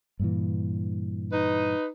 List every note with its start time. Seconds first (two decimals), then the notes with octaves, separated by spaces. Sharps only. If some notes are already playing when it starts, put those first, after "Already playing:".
0.19 G2 A#2 E3
1.32 D#4 B4